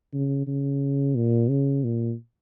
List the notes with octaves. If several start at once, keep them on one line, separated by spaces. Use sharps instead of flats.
C#3
C#3
A#2
C#3
A#2